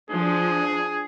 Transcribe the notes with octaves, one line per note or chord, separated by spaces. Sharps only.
F3 D4 G#4